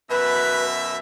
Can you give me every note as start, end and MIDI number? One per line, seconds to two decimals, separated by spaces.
0.10 0.98 42
0.10 0.98 47
0.10 0.65 71
0.10 0.98 76